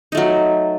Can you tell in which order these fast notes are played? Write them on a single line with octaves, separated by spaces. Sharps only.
D#4 A3 F#3